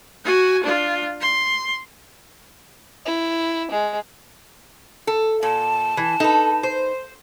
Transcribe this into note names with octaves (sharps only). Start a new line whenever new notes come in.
F#4 G#5
D4 F4
C6
E4
G#3
A4
A#2 A5
E3
D#4 A4 B4
C5